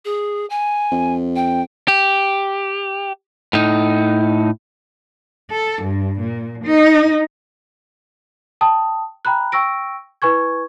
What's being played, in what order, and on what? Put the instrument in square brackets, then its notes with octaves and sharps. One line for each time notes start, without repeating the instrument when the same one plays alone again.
[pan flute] G#4
G#5
[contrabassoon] F2
[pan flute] G5
[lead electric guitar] G4
A2 D#4
[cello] A4
G2
A#2
D#4
[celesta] G5 A5 D#6
G5 A#5 B5 F#6
G5 C#6 E6 A#6 D7
E4 B4 G#5 C#6 G#6